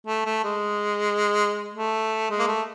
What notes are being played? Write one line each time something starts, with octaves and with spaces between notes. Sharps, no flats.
A3
A3
G#3
A3
G#3
A#3
A3